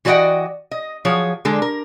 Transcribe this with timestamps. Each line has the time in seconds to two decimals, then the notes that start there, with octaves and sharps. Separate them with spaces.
0.05 E3 F#4 D5 D#5 F#5 G5
0.71 D#5
1.05 F3 F#3 G#4 C#5
1.45 D3 G#3 A4
1.62 A#4